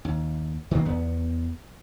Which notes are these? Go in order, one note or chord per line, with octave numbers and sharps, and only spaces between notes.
D#2
D#3 E3 A3 A#3
E2 B3